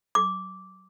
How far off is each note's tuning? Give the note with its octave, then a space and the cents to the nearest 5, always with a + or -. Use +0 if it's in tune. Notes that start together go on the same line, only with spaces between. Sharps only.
D6 -10